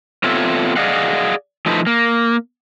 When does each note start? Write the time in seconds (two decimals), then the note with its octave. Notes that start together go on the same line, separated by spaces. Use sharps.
0.24 B3 C4 F4 A4 C#5 E5
0.76 G#4 D5 D#5 F5 F#5
1.66 F3 A3 D#4 E4 B4
1.87 A#3